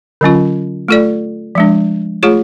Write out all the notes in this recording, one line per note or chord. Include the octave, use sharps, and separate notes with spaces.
D3 F#3 C#4 F4
A3 F4 A4 D5
F3 G#3 D4
A3 F4 G#4 C#5